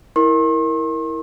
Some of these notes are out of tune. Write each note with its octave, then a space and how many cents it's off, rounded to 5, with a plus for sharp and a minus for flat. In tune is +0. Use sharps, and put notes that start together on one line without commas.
E4 -15 A#4 +0 C6 +45